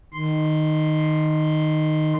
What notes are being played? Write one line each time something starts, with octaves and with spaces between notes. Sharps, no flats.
D#3 C6